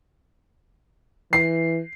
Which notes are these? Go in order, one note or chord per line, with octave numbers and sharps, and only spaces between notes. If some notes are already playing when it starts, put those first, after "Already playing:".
E3 C7